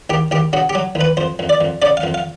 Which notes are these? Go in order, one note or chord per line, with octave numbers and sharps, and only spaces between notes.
D#2 G4
D#2 G4
C#3 F#4
G4
F#3
D#2
B4
F2 C5
F2
D5
F2
C#3 D5
F5
F2
F5